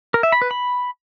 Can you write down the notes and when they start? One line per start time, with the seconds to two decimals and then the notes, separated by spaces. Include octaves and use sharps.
0.14 A#4
0.23 E5
0.32 B5
0.42 B4
0.51 B5